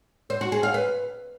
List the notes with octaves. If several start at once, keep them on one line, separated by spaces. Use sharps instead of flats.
C5
F#4
G#4
F5
B4